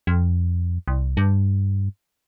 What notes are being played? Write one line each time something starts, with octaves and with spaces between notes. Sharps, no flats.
F2
C2
G2